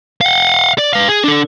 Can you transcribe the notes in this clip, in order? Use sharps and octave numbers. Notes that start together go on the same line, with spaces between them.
F5 F#5
D5
B4 F5
G#4
D4 A4